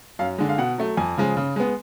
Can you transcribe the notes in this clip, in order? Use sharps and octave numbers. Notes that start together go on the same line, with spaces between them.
F#2 F5
D3 G#3
F5
B2 F#5
F#3 A3
F2 G#5
C#3 F3 G#3
C#3
G#3 B3